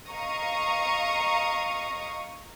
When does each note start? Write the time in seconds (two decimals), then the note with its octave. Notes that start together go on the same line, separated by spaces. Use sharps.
0.11 D#5 F5 A#5 C#6 D#6